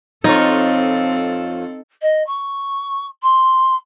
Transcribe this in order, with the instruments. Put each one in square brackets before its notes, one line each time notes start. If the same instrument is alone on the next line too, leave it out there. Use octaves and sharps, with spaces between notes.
[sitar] F2 F4 C#5 [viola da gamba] C4 A4 [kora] D#4
[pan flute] D#5
C#6
C6